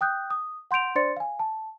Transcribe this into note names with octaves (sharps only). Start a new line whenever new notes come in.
G5 D#6 F#6 G6
D#6
F#5 C6 G6 D7 F7
D4 C5 D5 C6 A6 C#7
F5 G#5
A5